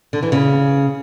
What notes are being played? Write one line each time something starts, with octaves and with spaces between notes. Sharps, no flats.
D3
E3
C#3